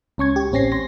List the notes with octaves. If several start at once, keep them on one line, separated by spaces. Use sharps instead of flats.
C#2 C#4 C#6 G#6
G4
A1 C4 C#4 A#6 C7
C6 A#6